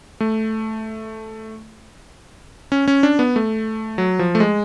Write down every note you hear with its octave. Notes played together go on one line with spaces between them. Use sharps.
A3
C#4
C#4
D4
B3
A3
F#3
F3
A3
G#3